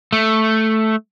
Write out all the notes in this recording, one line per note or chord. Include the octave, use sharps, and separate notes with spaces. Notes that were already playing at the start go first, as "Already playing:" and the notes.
A3